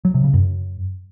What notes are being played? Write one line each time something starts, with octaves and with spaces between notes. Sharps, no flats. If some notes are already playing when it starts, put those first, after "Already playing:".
F#3
C3
C#3
F#2